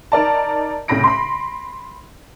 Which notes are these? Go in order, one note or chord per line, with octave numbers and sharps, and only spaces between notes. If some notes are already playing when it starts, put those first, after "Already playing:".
D#4 A#4 D5 A5
C2 A2 C#3 B5 A#6 D7
B5 C6